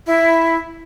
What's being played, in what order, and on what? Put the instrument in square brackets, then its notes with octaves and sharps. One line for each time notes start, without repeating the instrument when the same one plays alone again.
[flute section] E4